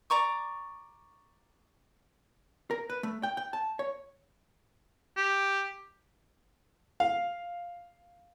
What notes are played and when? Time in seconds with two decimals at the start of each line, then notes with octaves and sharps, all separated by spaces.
0.10 D5 A#5 C#6 D6
2.71 A#4
2.90 B4
3.03 A3
3.23 G5
3.37 G5
3.53 A5
3.79 C#5
5.17 G4
7.00 F5